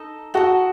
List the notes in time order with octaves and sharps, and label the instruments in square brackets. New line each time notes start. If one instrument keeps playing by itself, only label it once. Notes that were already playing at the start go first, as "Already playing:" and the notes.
Already playing: [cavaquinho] D#4 A4 D#5
[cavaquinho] D#4 A4 D#5 [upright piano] F#4